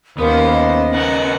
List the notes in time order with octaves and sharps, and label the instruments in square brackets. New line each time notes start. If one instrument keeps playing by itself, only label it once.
[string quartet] D#2 C5 [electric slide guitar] B3 [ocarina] C#4 [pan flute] A#4
[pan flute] D#5
[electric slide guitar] C#3 B3 A#4 [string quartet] F#5